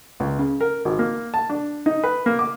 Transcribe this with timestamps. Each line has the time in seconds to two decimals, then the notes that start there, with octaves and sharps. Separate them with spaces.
0.20 C#2
0.39 C#3
0.61 A#4
0.85 G#1
0.99 A#3
1.34 A5
1.49 D4
1.86 D#4
2.03 B4
2.26 A#3
2.39 D6